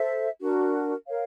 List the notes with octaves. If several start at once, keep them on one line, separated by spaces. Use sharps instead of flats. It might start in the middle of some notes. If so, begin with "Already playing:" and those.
Already playing: A4 C5 E5
D4 F#4 A#4
A#4 C#5 F5